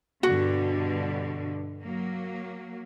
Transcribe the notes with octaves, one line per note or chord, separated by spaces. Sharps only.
G2 B2 D3 F#4
F#3 A#3